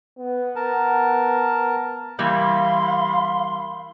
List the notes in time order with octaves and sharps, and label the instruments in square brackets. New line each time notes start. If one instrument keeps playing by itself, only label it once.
[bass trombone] B3
[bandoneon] A#4 A5
[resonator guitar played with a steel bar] E3 G3 A#3 [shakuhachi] F5 [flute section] B5 C6